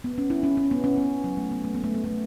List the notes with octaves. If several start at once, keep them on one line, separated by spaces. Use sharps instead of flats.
B3
C#4
E4
C#4
C#4
B3
C#4
B3
F#3
A3
B3
A3
B3
A3
B3
A3